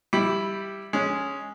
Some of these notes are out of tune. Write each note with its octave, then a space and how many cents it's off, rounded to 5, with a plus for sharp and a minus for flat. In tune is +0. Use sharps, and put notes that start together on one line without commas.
G3 +0 E4 +0
G#3 +0 C#4 +0